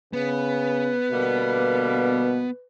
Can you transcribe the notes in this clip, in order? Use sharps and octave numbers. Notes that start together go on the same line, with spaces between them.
C#3 B3 B4
B2 D3 G3 A#3